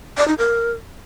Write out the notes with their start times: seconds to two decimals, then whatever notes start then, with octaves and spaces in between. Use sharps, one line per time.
0.17 D5
0.28 D#4
0.38 A#4